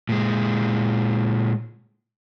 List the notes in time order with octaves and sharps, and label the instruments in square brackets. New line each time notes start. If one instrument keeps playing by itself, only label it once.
[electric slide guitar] A#2 G#3